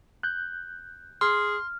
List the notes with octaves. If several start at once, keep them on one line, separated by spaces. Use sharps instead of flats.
F#6 G6
G#4 C6 F6